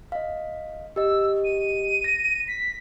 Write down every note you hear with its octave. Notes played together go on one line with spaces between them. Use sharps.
D#5 F5
G4 D#5 E6
D#7
A#6
B6